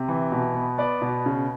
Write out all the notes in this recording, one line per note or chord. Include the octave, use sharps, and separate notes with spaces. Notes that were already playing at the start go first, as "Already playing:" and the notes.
Already playing: C3
E3
B2
B3
B3 D5
B2
C#3